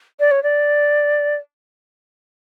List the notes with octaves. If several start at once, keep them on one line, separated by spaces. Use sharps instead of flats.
D5
C#5
D5